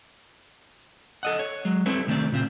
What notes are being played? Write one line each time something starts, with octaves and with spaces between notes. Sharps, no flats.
A4 D#5 F#5
C#5
F#3 G#3
G3 C4 E4 A4 B4 C#5
C2 D#3 A3 C4 D5
A#2 C#3 C4